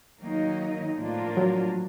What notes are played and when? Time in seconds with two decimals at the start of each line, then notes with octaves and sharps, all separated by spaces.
0.20 D#3 F#3 A#3 D#4
0.98 A2 F3 A#3 D4 F4
1.37 F#3